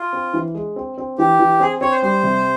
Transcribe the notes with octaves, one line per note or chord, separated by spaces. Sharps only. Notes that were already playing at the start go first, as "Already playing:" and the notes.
Already playing: F4
C4
E3
G#3
C4
C4
E3 G4
E3
C4 G#4
C4 C#5
C5
G3 C5
C3